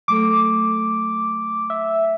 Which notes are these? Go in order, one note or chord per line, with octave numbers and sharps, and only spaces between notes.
F#3 A3 A4 D6
E5